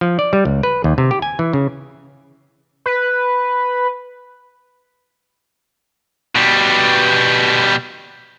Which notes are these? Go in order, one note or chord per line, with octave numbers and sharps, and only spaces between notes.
F3
D5
G3
C#2
B4
D#2
C3
G4
G#5
E3
C#3
B4
B2 G3